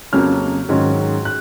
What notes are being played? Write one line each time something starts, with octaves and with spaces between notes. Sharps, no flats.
F2 C#3 F#3 A#3 C#4 F6
G#2 D#3 F#3 C#4
F#6